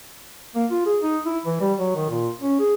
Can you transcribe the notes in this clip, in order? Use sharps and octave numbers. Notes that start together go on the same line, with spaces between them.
A#3
F4
G#4
D#4
E4
E3
G3
F#3
D#3
A#2
C#4
G#4